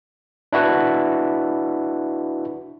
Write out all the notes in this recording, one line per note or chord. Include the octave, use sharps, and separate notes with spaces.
D4 E4 F#4 B4